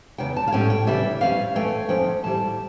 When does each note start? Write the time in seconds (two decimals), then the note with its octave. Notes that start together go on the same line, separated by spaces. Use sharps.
0.18 E2 C#3 G5
0.37 A5
0.48 F5
0.52 A2 G3 C#4 G5
0.70 G5
0.87 C#3 E3 G3 D4 E5
1.21 F2 E3 G3 C#4 F5
1.55 E2 E3 A3 C#4 G5
1.89 F2 D3 F3 C#4 G5
2.23 A2 E3 G3 A5